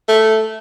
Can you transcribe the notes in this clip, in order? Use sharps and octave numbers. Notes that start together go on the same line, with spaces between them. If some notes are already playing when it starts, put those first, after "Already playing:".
A3